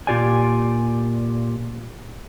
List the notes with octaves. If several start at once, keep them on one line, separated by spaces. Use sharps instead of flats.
A#2 A#3 F4 G4 D5 G#5